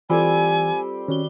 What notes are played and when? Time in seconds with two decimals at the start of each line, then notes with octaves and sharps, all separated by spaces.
0.10 E3 G3 C4 F4 G4 A4 G#5
1.08 D#3 C#4 F#4 G7